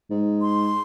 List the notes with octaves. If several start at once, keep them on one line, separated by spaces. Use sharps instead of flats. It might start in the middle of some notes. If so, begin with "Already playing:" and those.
G#2
C6